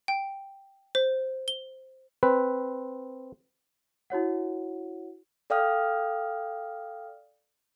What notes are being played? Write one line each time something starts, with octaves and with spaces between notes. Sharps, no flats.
G5
C5
G7
C4 B4
E4 F#4 C#5 F#5
A4 D5 F5 G5 D#6 F6